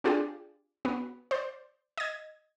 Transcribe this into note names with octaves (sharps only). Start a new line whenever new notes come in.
C4 D4 F4 G4 G#4 D5
B3 F#4
C5 D5
D#5 G#6